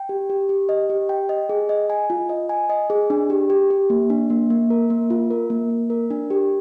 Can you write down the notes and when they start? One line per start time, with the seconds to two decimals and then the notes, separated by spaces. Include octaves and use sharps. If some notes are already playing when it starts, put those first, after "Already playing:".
Already playing: G5
0.09 G4
0.30 G4
0.49 G4
0.69 D#5
0.89 G4
1.09 G5
1.29 D#5
1.49 G#4
1.69 D#5
1.90 G#5
2.10 F4
2.29 D#5
2.49 G#5
2.69 D#5
2.90 G#4
3.10 D4
3.30 G4
3.50 G4
3.70 G4
3.90 A#3
4.10 D4
4.30 A#3
4.50 A#3
4.70 A#4
4.90 A#3
5.10 F4
5.30 A#4
5.50 A#3
5.70 A#3
5.90 A#4
6.10 D4
6.30 G4